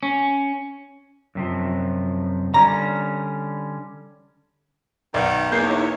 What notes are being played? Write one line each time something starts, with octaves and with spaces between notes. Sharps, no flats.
C#4
F#2 C3 F3
D3 G3 C#4 A#5
B1 D#3 D5 F#5
E2 A#3 D#4 E4 C#5 G6 C7